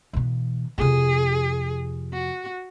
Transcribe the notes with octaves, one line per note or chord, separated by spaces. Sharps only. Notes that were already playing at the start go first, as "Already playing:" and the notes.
B2 E3
F2 C3 G#4
F#4